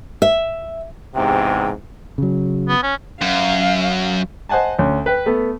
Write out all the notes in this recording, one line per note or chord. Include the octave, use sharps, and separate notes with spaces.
E5
E2 G#2 C3 G5
C#3 F#3
B3
C#4
F#2 F5
C5 D#5 F#5 G#5 A5
D2 C#4
B4 G5
A3 B3